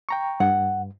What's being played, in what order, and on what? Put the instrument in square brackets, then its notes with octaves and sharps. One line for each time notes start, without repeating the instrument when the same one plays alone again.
[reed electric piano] G5 A#5 C#6
[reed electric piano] G2 [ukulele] F#5